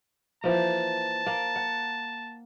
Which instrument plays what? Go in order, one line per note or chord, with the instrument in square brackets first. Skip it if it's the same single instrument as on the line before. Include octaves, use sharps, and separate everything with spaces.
[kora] E3 F3 A#3 [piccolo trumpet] A5
[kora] A#3 A#4
F#5